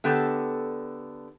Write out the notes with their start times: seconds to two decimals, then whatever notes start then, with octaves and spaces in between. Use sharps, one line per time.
0.04 D3 B3 G4 A4